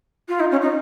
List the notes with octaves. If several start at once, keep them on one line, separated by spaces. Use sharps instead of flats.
F4
D#4
C#4
D#4